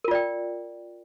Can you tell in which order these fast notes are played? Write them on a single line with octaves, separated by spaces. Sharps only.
A#4 F4 D5 G5